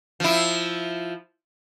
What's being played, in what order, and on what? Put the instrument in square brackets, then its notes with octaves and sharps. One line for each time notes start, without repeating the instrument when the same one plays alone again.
[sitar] F3 E4